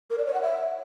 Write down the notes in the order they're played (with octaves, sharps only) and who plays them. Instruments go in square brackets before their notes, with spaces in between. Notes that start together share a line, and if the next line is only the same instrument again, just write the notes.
[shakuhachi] A#4
D5
C#5
F#5
E5